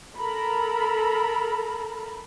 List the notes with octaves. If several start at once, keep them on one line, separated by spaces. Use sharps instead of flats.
A4 A#4 A#5 B5